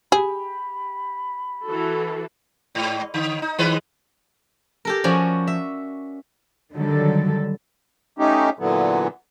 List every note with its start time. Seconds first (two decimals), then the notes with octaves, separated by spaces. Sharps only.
0.12 G4 G#4 B5
1.66 E3 F#4 A4
2.75 G#2
3.14 D3
3.42 D#4
3.58 D#3 G#3 B4
4.85 G4 A4 A#4
5.04 F3 C#4 F#4 D5 G#5
5.47 E5
6.73 D3 D#3 F#3 G3 A4
8.19 A3 C#4 D#4 G4
8.59 A#2 D3 E3 F#3 B3